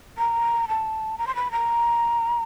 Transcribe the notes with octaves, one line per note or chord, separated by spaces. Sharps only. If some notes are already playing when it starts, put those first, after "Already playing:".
A#5
A5
A#5
C6
B5
A#5